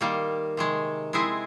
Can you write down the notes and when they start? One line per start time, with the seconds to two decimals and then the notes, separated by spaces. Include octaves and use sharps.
0.01 D#3 G3 A#3
0.57 C3 D#3 G#3
1.13 G#3 C4 E4 G#4